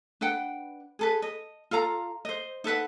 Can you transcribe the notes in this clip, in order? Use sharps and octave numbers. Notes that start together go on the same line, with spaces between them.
D4 B4 F#5 G5
G#4 A4 B4
D#5
F4 A4 F5 A#5
C5 D#5
D#4 A4 B4 F#5